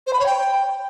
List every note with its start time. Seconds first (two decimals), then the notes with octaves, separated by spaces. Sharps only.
0.07 C5
0.13 B5
0.20 C#5
0.26 G5